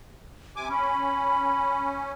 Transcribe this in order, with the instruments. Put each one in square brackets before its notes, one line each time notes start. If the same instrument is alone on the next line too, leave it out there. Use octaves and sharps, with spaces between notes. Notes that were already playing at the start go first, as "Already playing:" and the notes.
[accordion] C3 G#5 D6
[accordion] C#4 [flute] B5